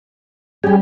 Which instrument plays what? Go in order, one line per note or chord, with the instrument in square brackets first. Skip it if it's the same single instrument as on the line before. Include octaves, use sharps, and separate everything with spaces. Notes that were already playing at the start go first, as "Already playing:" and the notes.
[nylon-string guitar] G3 C#4 [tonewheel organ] G4 G#4